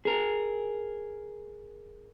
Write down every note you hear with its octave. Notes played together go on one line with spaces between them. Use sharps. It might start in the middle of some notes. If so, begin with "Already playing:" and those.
G#4 A#4